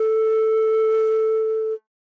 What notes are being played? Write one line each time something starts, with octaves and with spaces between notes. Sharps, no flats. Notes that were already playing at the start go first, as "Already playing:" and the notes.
Already playing: A4